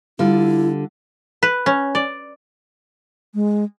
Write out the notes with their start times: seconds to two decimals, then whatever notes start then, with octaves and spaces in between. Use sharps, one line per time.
0.19 D3 G3 E4 F4
1.43 B4
1.66 C#4
1.95 D5
3.35 G#3